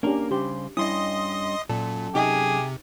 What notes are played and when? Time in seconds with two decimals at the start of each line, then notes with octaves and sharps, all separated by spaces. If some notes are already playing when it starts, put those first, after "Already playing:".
0.03 A#3 C#4 D4 G4 A#4
0.31 C#3 G3 G4 C5
0.77 G2 C#4 E4 D#5 C6 D#6
1.69 F#2 A#2 A4
2.15 C3 D#4 G4 G#4 D#5